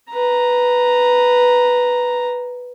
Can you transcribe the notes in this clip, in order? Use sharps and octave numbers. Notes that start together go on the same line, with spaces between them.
B4 A#5